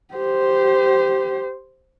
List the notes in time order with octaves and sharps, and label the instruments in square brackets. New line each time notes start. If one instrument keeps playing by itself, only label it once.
[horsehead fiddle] G4 C5